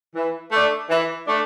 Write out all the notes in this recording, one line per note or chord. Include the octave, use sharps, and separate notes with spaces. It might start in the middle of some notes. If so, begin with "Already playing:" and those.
E3
A3 D4
E3
A3 D4